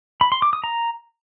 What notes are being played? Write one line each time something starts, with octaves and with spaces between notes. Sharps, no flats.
B5
C6
D6
D#6
A#5